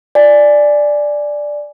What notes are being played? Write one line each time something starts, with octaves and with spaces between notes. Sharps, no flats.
D5 G#5